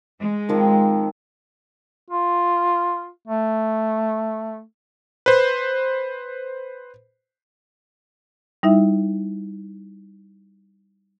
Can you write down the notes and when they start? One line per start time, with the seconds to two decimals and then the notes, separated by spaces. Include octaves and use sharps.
0.18 G#3
0.49 D#3 F3 C4
2.11 F4
3.28 A3
5.26 B4 C5
8.63 G3 D#4 E4 E5